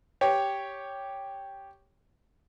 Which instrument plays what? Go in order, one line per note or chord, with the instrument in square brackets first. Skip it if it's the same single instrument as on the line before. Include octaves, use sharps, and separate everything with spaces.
[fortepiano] G4 C#5